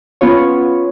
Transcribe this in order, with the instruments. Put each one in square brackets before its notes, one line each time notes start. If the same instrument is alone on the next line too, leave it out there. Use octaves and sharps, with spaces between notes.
[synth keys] B3 C#4 F4 C#5